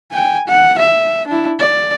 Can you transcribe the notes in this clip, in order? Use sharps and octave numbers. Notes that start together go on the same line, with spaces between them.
G5 G#5
F#5
E5
D4 E4
D5